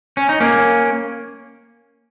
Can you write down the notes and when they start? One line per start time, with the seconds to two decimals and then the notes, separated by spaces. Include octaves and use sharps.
0.17 C#4
0.29 D#4
0.40 A#3 C#4